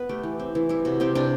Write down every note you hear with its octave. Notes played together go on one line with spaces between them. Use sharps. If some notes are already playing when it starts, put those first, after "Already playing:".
Already playing: B3 B4
A3 G4
E3
C4
E3
G3 E4
C3 F#4
C4 G4
C3 D4